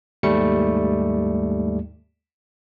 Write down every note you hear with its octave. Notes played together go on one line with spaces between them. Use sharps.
D#2 G#2 G3 A3 C#7